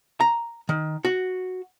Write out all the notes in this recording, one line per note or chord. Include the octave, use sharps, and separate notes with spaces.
A#5
D#3
F#4